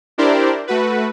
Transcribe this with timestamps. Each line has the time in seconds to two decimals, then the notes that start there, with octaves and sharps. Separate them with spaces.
0.18 D4 E4 G4 A#4 C5 D5
0.67 A3 F#4 B4